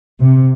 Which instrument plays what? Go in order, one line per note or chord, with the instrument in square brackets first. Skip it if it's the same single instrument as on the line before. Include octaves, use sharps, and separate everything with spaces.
[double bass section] C3